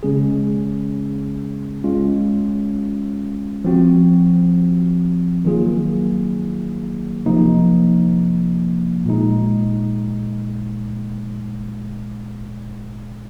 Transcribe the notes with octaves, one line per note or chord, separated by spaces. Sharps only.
C#3 G#3 C#4 G#4
G#3 C#4 F4
F3 C4 F#4
D#3 F#3 A#3 F4 G#4
C3 F3 A#3 D#4
A#2 G#3 D#4